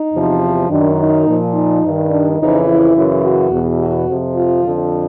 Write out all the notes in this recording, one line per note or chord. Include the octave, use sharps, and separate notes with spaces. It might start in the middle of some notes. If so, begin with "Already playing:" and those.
Already playing: D#4
E2 C3 F3
F#2 D#3 D4
D#4
A#2 F3
D#4
G2 D#3
D4
F2 C#3 E3 D#4
E4
F#2 C#3 E3
F#4
E2 B2
F#4
F2 C3 F3
F4
F2 D3 F3